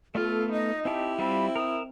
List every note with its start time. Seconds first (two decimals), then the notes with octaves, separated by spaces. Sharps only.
0.15 A3 B3 F4 A4
0.53 D#4 D#5
0.85 C4 E4 G4 E5 A5
1.19 G3 C4 F4 E5 B5
1.56 A#4 E5 D#6